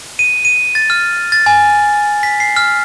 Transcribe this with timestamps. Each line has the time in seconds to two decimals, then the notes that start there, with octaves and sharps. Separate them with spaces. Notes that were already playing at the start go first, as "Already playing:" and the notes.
0.19 D#7
0.45 D#7
0.75 A6
0.90 F6
1.32 A6
1.46 G#5
2.23 B6
2.40 C7
2.56 F6